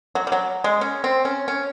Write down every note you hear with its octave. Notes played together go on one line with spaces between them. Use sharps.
F#3
G3
F#3
G#3
C#4
C4
C#4
C#4